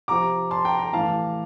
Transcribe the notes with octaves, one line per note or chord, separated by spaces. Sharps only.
C3 F3 A#5 D6
A5 C6
G5 A#5
G5 A#5
A2 E3 F5 A5